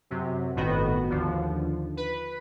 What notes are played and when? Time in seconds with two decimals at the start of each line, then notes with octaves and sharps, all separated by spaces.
0.10 F#2 C3 F#3
0.56 G1 A2 D#3 B3 F#4
1.10 D#2 D3 F3
1.97 B4